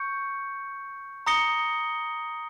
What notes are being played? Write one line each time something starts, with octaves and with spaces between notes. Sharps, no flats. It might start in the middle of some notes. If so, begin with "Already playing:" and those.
Already playing: C#6 G6 C#7
A#5 D#6 A#6 C#7 G7